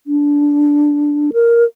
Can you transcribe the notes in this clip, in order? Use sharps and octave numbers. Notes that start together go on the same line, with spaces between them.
D4
A#4